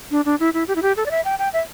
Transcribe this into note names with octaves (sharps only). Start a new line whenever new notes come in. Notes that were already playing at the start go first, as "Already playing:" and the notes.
D4
D4
E4
E4
G4
E4
G4
A4
D5
E5
G5
G5
E5